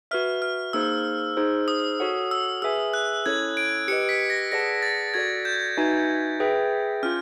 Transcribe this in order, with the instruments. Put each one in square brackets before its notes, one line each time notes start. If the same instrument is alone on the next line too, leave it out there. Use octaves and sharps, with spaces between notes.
[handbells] F#4 B4 E5 [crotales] F6
[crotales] F6
[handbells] A#3 D#4 G#4 C5 [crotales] E6
[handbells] D#4 G#4 C5
[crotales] D#6
[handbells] F#4 A4 C#5 F#5
[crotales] E6
[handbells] G#4 B4 E5 G#5 [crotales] E6
[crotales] F#6
[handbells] C#4 E4 A4 C#5 [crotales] G#6
[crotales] D7
[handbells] G4 [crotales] C#7
[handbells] B4 D#5
[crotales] B6
A#6
[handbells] G#4 B4 D5 F#5 A5 [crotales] A#6
[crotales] A6
[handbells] F#4 A4 D5 [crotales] G#6
[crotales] G6
[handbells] D#4 F#4 B4 E5 G#5
G#4 B4 E5 G5
[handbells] C#4 F4 [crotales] F6